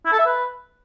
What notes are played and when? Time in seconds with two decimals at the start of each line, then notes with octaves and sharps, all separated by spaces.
0.05 E4
0.12 A4
0.19 E5
0.26 B4